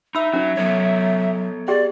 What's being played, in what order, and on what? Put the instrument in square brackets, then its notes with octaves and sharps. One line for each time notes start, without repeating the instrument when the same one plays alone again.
[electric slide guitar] D#4 [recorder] E5 [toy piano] B5 E6
[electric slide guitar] F#3 [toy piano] C#4 D#4
[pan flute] F#3 [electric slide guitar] B3 A4 C#5
[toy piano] G4 G#4 G5 [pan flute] D5